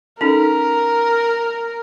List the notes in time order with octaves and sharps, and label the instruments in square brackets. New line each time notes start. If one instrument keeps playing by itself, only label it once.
[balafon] C#4 D#4 A4 [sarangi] A#4